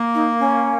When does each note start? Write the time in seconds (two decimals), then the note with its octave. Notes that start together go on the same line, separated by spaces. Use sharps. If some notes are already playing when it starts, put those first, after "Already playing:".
Already playing: A#3
0.14 D#4
0.39 C#4